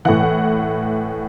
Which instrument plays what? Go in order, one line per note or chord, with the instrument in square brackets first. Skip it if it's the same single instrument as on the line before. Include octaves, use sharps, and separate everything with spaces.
[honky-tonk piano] A2 E3 F#5